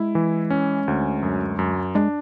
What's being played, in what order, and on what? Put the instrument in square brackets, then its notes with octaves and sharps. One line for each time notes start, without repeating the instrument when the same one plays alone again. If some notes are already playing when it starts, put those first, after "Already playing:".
Already playing: [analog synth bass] G#3 [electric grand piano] E4
[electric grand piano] E3
C#4
D2
F#2
F#2
[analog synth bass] G#3 [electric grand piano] D4